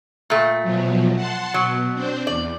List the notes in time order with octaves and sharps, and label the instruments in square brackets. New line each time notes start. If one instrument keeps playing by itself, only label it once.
[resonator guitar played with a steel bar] A#2 A3
[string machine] B2 F3 F#3
F#5 A5 C6
[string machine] B2 [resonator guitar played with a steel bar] F#3
[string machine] C4 D4 C5
[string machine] E2 [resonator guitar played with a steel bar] D5